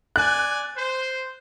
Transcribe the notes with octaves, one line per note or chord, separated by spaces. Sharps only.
D5 G#5 F#6
C5